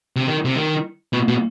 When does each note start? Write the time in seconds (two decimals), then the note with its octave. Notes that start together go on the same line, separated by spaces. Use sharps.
0.16 C3
0.27 D#3
0.45 C3
0.56 D#3
1.13 B2
1.28 B2